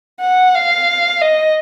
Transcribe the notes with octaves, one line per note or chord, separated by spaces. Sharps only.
F#5
F5
D#5